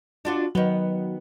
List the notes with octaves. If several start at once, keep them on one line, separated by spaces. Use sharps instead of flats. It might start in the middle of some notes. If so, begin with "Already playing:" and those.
D4 F4 F#4
D#3 F#3 B3